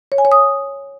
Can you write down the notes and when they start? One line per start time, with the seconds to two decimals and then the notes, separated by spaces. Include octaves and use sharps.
0.12 C#5
0.18 G#5
0.25 C#5
0.32 D#6